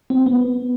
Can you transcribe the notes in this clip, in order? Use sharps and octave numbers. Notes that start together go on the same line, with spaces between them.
C4
B3